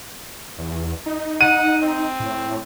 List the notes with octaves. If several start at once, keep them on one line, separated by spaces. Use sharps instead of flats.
E2
D#4
F#5 D#7
C4
A2